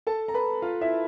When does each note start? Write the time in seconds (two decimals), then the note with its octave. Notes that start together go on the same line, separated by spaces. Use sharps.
0.07 A4 A5
0.28 A#5
0.34 B4 B5
0.62 F4 F5
0.81 E4 E5